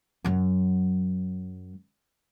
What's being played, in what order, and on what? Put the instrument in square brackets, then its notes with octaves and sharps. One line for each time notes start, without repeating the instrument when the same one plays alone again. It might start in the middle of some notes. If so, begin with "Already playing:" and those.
[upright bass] F#2 F#3